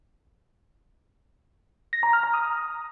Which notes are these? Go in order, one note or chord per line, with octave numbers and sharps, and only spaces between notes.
A#6
A#5
F6
A#5
D#6